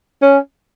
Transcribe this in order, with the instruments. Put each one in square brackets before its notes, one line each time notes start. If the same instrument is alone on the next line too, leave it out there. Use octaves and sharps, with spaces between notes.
[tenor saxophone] C#4